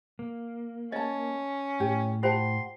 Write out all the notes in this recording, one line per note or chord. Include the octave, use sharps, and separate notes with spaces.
A#3
C#4 C#5 D#5 A5
A2 G4 C#5
F4 G4 C5 F#5 A5 C6